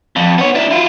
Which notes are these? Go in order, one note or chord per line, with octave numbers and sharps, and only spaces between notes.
F2
B3 C#5
D4 E4
E4 F4